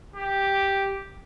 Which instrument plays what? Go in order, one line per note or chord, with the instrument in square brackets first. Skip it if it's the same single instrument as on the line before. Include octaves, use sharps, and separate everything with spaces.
[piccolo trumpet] G4